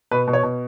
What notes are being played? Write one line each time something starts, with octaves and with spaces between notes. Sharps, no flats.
B2 B4
B2
C#5
B2